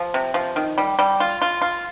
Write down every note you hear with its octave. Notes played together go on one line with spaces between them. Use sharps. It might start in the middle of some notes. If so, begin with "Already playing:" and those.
Already playing: F3
C3
F3
D#3
G3
G3
F4
F4
F4